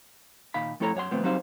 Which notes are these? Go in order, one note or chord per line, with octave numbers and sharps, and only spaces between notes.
A#2 D#3 F5 B5
F2 A3 E4 A4 C#5 A#5
F#2 C#5 F#5 C6
D#2 B2 F3 A3 B3 C4
F#3 G3 C4 D#4 C5 F5